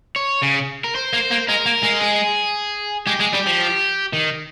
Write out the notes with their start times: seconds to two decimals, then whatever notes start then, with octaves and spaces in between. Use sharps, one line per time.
0.16 C#5
0.43 C#3
0.84 A#4
0.95 C5
1.13 A#3
1.31 A#3
1.48 G#3 A#4
1.66 A#3
1.83 G#3
2.01 G#4
3.07 G#3 G4
3.20 G#3 G#4
3.33 G3 G4
3.47 F3
4.13 D#3